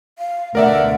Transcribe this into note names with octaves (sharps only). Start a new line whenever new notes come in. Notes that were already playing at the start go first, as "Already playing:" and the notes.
F5
D2 B2 A#4 D5 E5 F#5